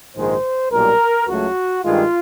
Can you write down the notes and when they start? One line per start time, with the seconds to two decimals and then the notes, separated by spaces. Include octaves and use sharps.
0.16 A#1 G#2 D#3 G#3 C5
0.72 B1 A#2 G3 A#4
1.28 C#2 C#3 F#3 A3 F#4
1.84 G2 D#3 G#3 F4